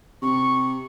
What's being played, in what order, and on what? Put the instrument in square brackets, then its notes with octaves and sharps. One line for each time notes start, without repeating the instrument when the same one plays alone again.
[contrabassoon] C3 [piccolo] C#6